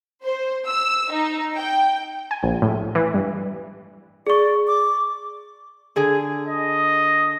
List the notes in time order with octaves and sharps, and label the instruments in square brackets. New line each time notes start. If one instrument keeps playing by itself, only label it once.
[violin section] C5
E6
D#4
G5
[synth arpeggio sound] G#5
A#1
A2
E3
G2
[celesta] G#4 C#6 [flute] D5
[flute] D6
[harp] D3 G#4 G#5
[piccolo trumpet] D#5